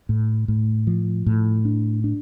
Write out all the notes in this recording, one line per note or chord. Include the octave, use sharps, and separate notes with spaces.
A2
A2
F3
A2
D4
D4